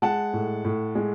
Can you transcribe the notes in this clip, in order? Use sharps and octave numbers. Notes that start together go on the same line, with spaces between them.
G#3 F#5 A5
A2
A2
G#3